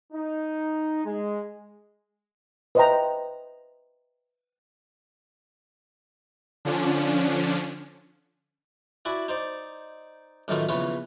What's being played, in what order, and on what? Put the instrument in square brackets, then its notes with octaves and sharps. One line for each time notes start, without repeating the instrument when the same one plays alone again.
[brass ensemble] D#4
G#3
[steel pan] B4 C5 D#5 E5 G5 A#5
[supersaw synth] D3 F3 C#4 D4
[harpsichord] E4 F#4 D5 G#5 B5
D#4 C5 D5
F#2 A2 D#3 E3 A3 F4
A#1 C#3 E3 B3 F4 C#5